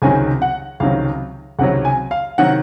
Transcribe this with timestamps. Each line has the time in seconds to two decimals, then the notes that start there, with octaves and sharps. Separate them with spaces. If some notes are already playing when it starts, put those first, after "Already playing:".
0.02 C#2 C3 D#3 F#3 G#5
0.42 F#5
0.80 C#2 C3 D#3 F#3 F5
1.59 C#2 C3 D#3 F#3 F#5
1.85 G#5
2.11 F5
2.38 C3 D#3 F#3 F#5